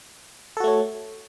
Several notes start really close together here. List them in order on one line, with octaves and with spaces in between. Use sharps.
A4 F#4 A3 C#5